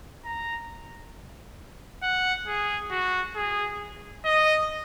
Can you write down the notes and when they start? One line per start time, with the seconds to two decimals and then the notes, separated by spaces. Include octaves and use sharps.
0.25 A#5
2.02 F#5
2.47 G#4
2.91 F#4
3.36 G#4
4.25 D#5